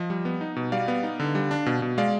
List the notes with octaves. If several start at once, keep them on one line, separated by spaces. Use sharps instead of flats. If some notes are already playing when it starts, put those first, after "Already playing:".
Already playing: F3 D#5
G3
B3
D#4
B2
G3 D5 F5
B3
D#4
D3
G3
D4
B2
B2
G#3 D5 F5